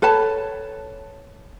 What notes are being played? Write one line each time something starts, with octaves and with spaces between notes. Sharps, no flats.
A4 B4 C#5 A5